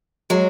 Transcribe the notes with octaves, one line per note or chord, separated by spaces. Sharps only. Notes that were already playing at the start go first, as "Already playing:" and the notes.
F#3 G#3